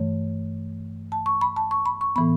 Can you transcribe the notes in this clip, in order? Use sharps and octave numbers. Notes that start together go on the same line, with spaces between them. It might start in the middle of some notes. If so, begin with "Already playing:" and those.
Already playing: G2 E3 A3 C#5
A5
C#6
B5
A5
C#6
B5
C#6
A2 E3 B3 B5